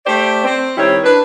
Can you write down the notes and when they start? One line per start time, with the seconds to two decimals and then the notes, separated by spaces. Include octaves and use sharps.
0.06 A3 G4 C5 D5
0.44 C4
0.77 D#3 G3 C4 E4 C#5
1.04 D4 B4